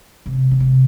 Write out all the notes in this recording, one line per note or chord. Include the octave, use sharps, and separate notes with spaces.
C3
D3
C3